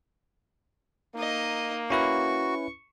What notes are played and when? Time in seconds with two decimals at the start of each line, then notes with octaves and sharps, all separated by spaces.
1.15 A#3 D#4 D#5
1.90 C#4 E4 F#4 B4 C#6